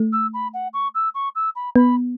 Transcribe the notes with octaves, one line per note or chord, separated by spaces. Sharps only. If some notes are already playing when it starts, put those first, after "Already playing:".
Already playing: A3
E6
B5
F#5
C#6
E6
C#6
E6
B5
B3 B5